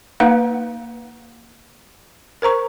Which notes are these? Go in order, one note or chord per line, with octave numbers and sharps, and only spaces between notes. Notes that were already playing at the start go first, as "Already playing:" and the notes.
A#3 D#4 B4 F5 F#5
A#4 C5 A#5 C#6